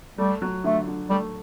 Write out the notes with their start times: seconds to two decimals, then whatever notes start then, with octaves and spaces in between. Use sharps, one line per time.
0.18 G3 A3
0.42 F#3
0.64 D3 A3
0.87 D3
1.10 G3 A3